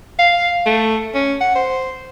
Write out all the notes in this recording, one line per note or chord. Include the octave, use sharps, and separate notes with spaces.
F5
A3
C#4
F#5
C5